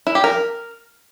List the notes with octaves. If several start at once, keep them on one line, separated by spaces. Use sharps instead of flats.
E4
G4
A#4